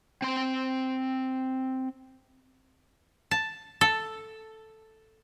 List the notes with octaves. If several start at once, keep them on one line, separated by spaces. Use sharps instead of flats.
C4 C6
A5
A4